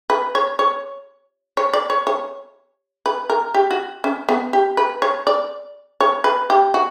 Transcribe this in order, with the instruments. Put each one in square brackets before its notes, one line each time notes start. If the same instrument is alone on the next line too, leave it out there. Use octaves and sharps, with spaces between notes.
[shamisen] B4
C#5
C#5
C#5
D5
C#5
C#5
B4
A#4
G4
F#4
C#4
B3
G4
B4
C#5
D5
C#5
B4
G4
F#4